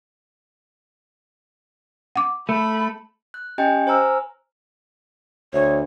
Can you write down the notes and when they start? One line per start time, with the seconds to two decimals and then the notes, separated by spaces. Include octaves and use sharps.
2.16 F#5 D6
2.49 A3 A4 B5
3.34 F#6
3.58 C#4 G4 D#5 G5 G#5
3.87 C5 G#5 A#5 E6 F6
5.53 D2 C#5